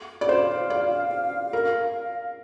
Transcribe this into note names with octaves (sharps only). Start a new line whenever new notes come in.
D5
C5 F5
D5
A#4